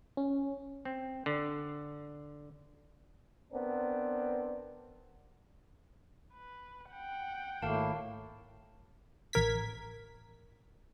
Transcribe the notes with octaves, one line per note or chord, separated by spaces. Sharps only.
C#4
C4
D3
B3 C4 D4 A#4
B4
F#5 G5
G#1 A2 A3 A#3 A#4 F5 A5
A1 A#4 G#6 B6